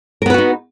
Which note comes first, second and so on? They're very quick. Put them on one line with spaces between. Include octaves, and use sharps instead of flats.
A#4 B3 B4 F#4 D#4